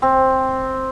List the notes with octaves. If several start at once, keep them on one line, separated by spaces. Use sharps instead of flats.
C4